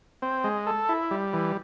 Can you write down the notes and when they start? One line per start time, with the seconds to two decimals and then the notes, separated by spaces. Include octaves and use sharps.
0.22 C4
0.44 G#3
0.67 A4
0.89 E4
1.11 G3
1.33 E3